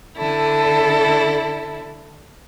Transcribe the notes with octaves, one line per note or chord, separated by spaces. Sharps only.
D3 E4 A4